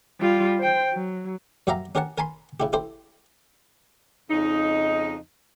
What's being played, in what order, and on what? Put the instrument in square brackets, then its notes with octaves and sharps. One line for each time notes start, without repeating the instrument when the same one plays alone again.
[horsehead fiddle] G3 F4
C5 G5
F#3
[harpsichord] F#2 F#3 G4 E5 F5 A#5
C#4 G4 A#4 C#5 F#5 A5
A#4 G#5 A5 B5 C6
C#3 E4 G4
E4 G4 A4 C5
[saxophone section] F2 C#3 D#4